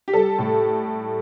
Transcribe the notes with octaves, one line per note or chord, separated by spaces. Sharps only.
G4
G3 A4
A2